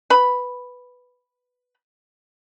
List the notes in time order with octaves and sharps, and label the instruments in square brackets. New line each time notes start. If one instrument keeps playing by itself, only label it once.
[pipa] B4 B5